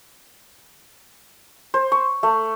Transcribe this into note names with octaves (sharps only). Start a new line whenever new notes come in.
C5
C#6
A3